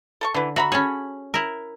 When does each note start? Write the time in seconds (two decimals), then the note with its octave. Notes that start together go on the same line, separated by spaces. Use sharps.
0.21 A4 A5 C#6
0.34 D3 E3 B4
0.56 F#4 E5 A#5 B5
0.72 C#4 G#4 A4 C#5 B5
1.34 E4 A#4